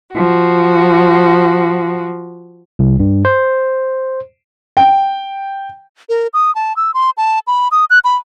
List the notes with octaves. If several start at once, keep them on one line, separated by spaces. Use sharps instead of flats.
F3 F#4
C2
G2
C5
G5
A#4
D#6
A5
E6
C6
A5
B5
D#6
F#6
B5